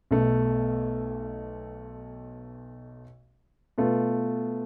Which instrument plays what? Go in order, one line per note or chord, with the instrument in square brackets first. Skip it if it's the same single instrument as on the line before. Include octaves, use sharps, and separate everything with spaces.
[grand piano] B1 B2 A3
B2 A3 F4 B4